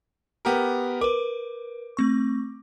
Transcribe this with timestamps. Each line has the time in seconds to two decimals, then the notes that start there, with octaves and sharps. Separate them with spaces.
0.45 B3 G4 A#4
1.01 A#4 B4 D6
1.97 A3 C4 C#6